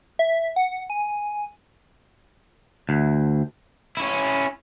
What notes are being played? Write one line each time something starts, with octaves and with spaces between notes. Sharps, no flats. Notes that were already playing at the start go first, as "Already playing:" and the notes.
E5
F#5
G#5
D2
C#4 E4